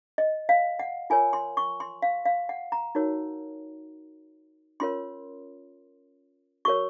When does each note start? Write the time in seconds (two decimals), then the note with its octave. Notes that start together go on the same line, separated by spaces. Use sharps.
0.18 D#5
0.49 F5
0.79 F#5
1.10 F4 A#4 C#5 G#5
1.33 C6
1.57 C#6
1.80 C6
2.02 F5
2.25 F5
2.49 F#5
2.72 A#5
2.95 D#4 F#4 A#4 C#5
4.80 C#4 F4 A#4 C#5 C6
6.65 F#4 A#4 C#5 C#6